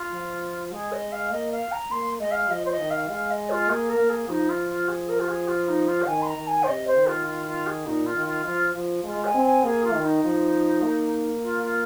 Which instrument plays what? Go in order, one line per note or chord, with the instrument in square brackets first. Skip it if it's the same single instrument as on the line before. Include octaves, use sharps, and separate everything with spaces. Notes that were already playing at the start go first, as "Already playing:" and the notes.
Already playing: [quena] F4
[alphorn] F3
[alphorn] G#3 [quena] G#4
[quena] D#5
F5
[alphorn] A#3 [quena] D#5
[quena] F5
A#5
[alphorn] A#3 [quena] C6
[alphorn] G#3 [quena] D#5
[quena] F5
[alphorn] F3 [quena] D#5
[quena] C5
D#5
[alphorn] D#3
[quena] F5
[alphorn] G#3 [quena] F5
[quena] D#5
F4
[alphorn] A#3 [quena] G#4
[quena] A#4
[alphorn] A#3
[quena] G#4
[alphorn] F3 [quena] D#4
[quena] F4
F4
G#4
A#4
F4
G#4
F4
D#4
F4
F5
[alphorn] D#3 [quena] G#5
[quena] C6
A#5
[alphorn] D#3
[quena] G#5
C5
[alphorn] C3 [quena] D#5
[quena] C5
[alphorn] D#3
[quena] F4
F4
F4
G#4
[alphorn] A#2 [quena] D#4
[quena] F4
[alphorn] D#3
[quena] F4
[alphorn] F3 [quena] F4
[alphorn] F3
[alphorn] G#3 [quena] F4
[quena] G#5
[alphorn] C4
[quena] G#5
[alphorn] A#3 [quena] G#4
[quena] F4
[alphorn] D#3
[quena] D#4
[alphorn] F3
A#3
[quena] F4
F4